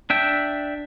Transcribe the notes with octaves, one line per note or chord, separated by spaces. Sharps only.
D4 E5 G5